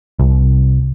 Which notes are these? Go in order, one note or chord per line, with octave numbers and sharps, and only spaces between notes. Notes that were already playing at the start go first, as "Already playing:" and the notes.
C2